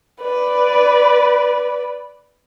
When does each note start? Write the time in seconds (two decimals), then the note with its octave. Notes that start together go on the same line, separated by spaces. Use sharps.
0.22 B4 D5